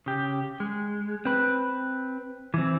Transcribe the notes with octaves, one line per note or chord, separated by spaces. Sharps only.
C#3 G4
G#3
C4 B4
E3 C4